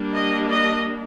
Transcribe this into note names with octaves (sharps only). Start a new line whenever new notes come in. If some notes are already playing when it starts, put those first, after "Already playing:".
Already playing: G3 A#3 D4
D#5
D#5